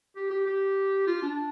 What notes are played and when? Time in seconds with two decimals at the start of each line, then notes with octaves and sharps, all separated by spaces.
0.16 G4
0.30 G4
0.46 G4
1.07 F4
1.22 D4